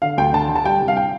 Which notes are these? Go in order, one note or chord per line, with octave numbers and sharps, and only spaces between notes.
D3 F5
D2 G5
D3 A5
D3
A5
G3 G5
C2
F5
G5